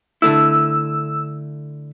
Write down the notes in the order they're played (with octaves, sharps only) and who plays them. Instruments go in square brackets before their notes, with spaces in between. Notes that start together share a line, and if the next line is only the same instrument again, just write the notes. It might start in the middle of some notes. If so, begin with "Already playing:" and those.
[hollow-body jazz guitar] D3 A3 E4 [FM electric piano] E6